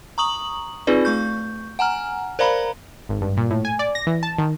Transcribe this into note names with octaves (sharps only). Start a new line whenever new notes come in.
A#5 C#6 D#6 F#7
C4 D#4 F4 G#4 B4 D5
A3 C#6 G6
F#5 G#5 A#5 F6
A#4 C5 D5 F5 A#5 B5
G#1
G2
A#2
A2
G#5
D5
A#6
E3
A5
D#3